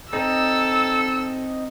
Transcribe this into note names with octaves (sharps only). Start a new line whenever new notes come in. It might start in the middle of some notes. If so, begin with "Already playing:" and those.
C4 D#4 A4 E6